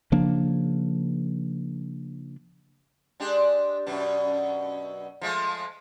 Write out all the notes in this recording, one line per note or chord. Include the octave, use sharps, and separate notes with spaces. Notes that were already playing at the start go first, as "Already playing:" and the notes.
C#3 F3 A#3 D4
G#3 D4 G4
F#2 B2 D4
F3 G#3 A3